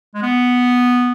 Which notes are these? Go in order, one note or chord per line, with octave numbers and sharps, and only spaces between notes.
G#3
B3